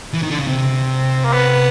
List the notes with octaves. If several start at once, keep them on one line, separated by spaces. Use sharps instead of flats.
E3
D#3
D3
C#3
C3 C4
A#3
B3